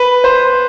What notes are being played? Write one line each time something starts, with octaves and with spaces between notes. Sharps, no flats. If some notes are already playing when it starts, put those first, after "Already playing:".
Already playing: B4
C5